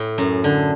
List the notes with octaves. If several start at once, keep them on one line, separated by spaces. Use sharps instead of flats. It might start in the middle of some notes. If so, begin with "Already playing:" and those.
Already playing: A2
F#2
D3